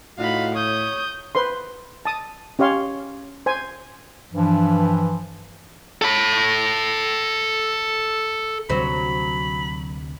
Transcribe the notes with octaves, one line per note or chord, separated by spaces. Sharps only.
A2 D#4 F4 F#4 F5 B5
C#5 D#6 G6
B4 C5 C6
A5 D#6
C#4 G4 C#5 F5 C6
C5 G#5
G2 E3 F3
A4 B5
D2 C3 F#3 C5 B5